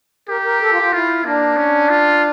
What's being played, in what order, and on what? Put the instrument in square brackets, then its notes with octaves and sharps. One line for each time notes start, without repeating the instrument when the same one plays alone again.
[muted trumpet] G4 [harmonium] A#4
[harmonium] A#4
A4
F4
F4
[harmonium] E4 [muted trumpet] F4
[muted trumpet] A#3 [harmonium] D4
[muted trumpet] C#4
F4